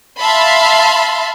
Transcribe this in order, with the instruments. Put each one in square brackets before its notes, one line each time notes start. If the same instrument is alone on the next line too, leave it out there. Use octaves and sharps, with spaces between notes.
[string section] E5 F5 A5 B5 C6